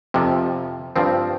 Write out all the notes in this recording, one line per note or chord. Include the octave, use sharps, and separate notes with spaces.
F2 C3 F3
G2 F3 C4